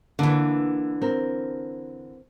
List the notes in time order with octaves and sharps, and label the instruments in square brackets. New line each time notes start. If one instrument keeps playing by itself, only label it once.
[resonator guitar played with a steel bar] D3 E3 [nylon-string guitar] A#3 B3
[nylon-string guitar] C4 A#4